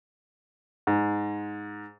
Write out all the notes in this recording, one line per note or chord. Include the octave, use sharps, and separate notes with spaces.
G#2